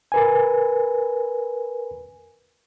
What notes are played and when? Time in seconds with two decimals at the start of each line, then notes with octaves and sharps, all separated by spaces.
0.12 A#4 B4 G#5